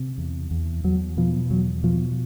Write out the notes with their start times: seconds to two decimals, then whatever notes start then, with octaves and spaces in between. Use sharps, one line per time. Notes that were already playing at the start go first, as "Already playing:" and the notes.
Already playing: C3
0.18 E2
0.51 E2
0.84 E2 F#3
1.17 B2 F3
1.50 E2 F#3
1.84 B2 F3